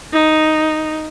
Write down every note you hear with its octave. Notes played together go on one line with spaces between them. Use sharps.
D#4